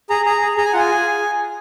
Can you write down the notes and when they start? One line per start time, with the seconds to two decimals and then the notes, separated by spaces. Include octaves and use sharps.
0.10 G#4 A#5
0.26 G#4 A#5
0.41 G#4
0.57 G#4 A#5
0.65 G#5
0.73 F4 F#5
0.79 G#5
0.90 G#4